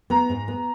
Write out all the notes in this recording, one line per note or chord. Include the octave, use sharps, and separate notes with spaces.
B3 A#5
G#2
B3